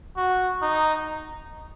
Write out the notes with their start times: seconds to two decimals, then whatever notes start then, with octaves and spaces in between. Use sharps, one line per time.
0.17 F#4
0.62 D#4